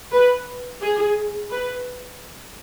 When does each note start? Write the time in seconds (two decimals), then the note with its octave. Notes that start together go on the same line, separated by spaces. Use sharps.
0.13 B4
0.81 G#4
1.51 B4